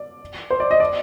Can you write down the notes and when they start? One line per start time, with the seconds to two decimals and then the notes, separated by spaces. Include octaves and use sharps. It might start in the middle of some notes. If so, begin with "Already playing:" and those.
Already playing: D5
0.50 C5
0.60 D5
0.71 D#5
0.80 D5